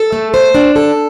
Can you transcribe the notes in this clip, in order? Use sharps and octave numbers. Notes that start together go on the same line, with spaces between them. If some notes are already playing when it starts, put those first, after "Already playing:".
Already playing: A4
A3
C5
D4
A4